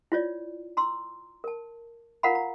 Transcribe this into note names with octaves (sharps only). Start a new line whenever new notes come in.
E4 F4 C#5 D5
A#5 C6 E6
A#4 A5
F4 A#4 F5 F#5 A#5 B5
A#5